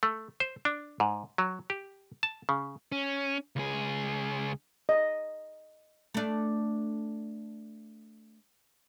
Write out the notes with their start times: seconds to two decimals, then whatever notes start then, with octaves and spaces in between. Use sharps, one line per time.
0.03 A3
0.40 C5
0.65 D4
1.00 G#2
1.38 F#3
1.70 G4
2.23 A5
2.49 C#3
2.92 C#4
3.56 C#2 G#4
4.89 D#5
6.14 A3 D4